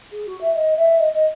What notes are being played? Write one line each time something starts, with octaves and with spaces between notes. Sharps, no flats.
G#4
F#4
E5
D#5
E5
D#5
D#5